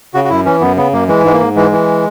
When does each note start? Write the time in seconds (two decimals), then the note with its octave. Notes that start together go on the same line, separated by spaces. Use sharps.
0.14 C#3 F#4
0.24 F#4
0.30 F#2 E4
0.45 E3 C#4
0.61 F#2 B3
0.77 C#3 B3
0.93 F#2 A#3
1.08 E3 G#3
1.24 G#2 G#3
1.33 A#3
1.40 G#2
1.56 E3 G#3
1.71 E3